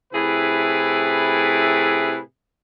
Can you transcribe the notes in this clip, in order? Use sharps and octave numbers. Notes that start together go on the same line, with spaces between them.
A2 C3 E4 G#4 B4